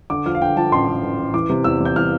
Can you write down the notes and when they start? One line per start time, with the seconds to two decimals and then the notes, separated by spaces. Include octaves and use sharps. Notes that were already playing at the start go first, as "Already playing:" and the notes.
0.10 D3 D6
0.26 F3 F6
0.35 F5
0.41 D3 G5
0.57 F3 A5
0.72 A1 C6
0.88 A1
1.02 A1
1.18 A1
1.33 E3 D6
1.50 C3
1.64 E2 E6
1.80 E2
1.85 G6
1.95 E3 F6